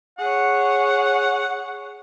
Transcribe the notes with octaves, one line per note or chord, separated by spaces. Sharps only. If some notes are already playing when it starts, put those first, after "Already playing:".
G#4 C#5 F#5